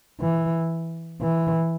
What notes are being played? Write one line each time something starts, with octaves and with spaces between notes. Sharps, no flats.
E3
E3